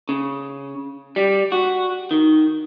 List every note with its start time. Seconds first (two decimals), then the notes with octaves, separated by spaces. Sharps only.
0.09 C#3
1.16 G3
1.52 F#4
2.11 D#3